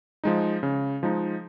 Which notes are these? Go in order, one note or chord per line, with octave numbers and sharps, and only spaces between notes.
F3 G#3 D#4
C#3
F3 G#3 D#4